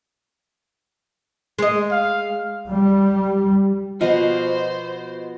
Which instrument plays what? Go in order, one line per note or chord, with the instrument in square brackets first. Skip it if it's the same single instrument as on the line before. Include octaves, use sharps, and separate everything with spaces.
[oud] G#3 D#5
[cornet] F5
[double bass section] G3
[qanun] B2 F3 F#4 [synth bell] F4 D#5 [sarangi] C5